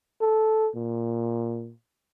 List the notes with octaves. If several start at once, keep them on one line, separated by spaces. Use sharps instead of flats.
A4
A#2